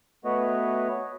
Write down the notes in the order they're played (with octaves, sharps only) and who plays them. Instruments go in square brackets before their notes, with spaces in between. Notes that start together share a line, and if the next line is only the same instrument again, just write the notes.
[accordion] A3 B3 F#4 B4 C#5 D#5